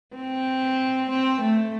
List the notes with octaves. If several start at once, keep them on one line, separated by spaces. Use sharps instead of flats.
C4
C4
A3